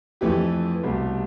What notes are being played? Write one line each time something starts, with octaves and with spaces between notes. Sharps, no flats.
F2 E3 A3 G4
C2 B2 A3 G4